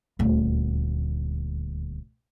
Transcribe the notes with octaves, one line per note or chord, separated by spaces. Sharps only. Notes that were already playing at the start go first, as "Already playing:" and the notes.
D#1 D2